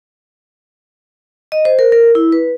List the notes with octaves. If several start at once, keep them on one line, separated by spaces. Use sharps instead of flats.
D#5
C5
A#4
A#4
E4
B4